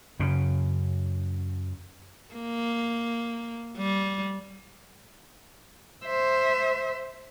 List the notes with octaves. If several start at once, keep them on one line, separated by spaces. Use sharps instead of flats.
F#2 C#3
A#3
G3
C5 E5